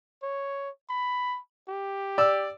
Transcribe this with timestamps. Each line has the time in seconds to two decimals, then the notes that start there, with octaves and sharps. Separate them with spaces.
0.23 C#5
0.89 B5
1.68 G4
2.18 D5 E6